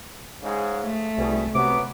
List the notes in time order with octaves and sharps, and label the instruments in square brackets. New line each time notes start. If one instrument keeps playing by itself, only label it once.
[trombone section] G#2 C#3 G#3
[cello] A3
[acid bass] C2 [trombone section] B2 G3 G#4
[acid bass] C3 [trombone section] F#3 B3 [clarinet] D6